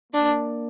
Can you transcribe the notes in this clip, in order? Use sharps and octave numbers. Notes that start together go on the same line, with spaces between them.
A#3 D4